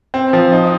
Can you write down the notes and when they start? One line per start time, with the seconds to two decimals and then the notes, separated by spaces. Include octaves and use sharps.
0.14 C4
0.33 F3
0.52 D#4